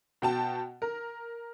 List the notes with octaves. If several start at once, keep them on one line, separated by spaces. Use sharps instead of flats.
B2 G5 A5
A#4